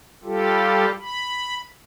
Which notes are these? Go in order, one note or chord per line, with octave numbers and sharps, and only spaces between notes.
G3 F4 G4 A4
B5